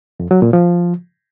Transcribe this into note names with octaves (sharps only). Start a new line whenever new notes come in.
F2
F#3
A#2
F3